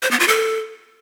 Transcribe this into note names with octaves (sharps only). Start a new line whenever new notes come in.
C5
B3
F4
A4